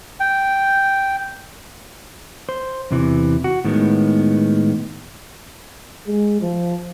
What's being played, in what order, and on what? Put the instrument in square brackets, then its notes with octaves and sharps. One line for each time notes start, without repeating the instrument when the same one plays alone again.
[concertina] G5
[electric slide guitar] C5
E2 C3 E3
F#4
A2 D#3 G#3 B3
[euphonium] G#3
F3